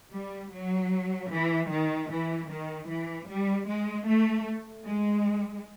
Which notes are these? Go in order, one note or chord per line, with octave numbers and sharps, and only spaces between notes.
G3
F#3
E3
D#3
E3
D#3
E3
G3
G#3
A3
G#3